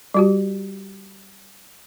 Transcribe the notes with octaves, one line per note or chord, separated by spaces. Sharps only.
G3 F#4 G4